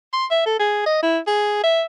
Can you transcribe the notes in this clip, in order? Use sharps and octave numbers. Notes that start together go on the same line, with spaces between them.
C6
E5
A4
G#4
D#5
E4
G#4
E5